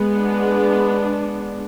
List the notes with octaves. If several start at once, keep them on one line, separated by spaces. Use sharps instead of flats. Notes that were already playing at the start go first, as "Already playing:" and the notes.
Already playing: G#3 B3
D4